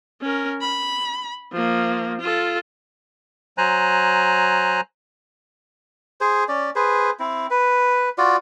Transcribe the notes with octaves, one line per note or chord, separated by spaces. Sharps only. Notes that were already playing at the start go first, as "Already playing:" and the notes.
C#4 A#4
B5
F3 A#3
F4 A4
F#3 C5 G#5 A#5 F#6
G#4 C5
C#4 D5
G#4 B4 C5
C4 E4
B4
F4 F#4 D5